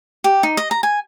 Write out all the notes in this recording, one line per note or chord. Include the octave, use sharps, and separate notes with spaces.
G4
D#4
D#5
A#5
G#5